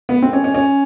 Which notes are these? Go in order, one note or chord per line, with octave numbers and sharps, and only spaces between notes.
B3
C4
C#4
C#4
C#4